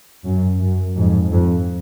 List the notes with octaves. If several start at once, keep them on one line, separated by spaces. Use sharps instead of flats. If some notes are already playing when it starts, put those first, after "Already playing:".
F#2
F#2
F2 G#2
F2